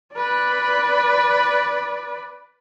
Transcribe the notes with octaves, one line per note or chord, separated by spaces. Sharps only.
B4 D5